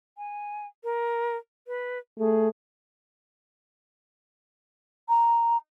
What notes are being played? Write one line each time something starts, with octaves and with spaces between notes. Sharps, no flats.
G#5
A#4
B4
A3 G#4
A#5